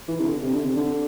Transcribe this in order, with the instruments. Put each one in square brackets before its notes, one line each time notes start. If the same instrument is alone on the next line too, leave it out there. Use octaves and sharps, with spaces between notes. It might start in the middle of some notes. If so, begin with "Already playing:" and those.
[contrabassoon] E3
C3
D3
C3
D3
C3
D3